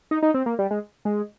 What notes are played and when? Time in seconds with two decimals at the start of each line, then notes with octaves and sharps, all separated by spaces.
0.11 D#4
0.23 D#4
0.34 C4
0.46 A#3
0.59 G3
0.71 G#3
1.05 G#3